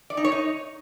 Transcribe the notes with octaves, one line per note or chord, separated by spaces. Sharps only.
D5
D#4
C#5
D#4